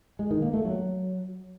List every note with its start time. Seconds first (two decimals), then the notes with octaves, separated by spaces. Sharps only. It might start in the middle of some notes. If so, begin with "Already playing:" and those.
0.19 G#3
0.31 D#3
0.42 A#3
0.53 A3
0.65 F#3